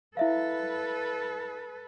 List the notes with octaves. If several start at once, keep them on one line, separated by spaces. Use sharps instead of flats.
E4 A4 B4 E5 F5